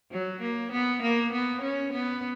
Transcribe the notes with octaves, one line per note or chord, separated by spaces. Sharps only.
F#3
A#3
B3
A#3
B3
C#4
B3